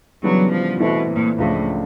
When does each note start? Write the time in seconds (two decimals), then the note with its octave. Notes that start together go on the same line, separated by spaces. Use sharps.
0.23 C#3 E3 F#3 G3 B3 D4
0.52 F3
0.80 B2 E3 A3 C4 E4 A4
1.10 A#2
1.38 C#2 A2 C#3 F3 A3 D4